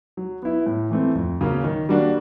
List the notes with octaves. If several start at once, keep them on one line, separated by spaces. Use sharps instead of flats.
F#3
B3 E4
A2
E3 A3 C4
F2
C#3 F#3 A#3 C#4
D#3
G3 A#3 D4 F#4